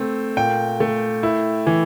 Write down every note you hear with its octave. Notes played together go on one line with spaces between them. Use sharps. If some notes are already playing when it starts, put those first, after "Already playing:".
Already playing: A3 C4
A#2 G5
A3
E4
E3